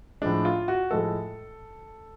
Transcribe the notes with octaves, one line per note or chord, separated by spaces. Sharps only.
A2 F3 G#3 D4
F4
F#4
A2 F3 G#3 A4